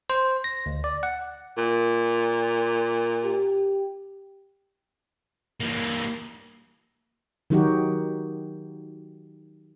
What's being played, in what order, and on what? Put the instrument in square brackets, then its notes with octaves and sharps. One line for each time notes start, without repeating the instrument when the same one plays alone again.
[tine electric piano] C5
A#6
D2
D5
F#5
[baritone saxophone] A#2
[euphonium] G4
[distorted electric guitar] E3 A#3
[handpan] D#3 F#3 D#4 F#4 G4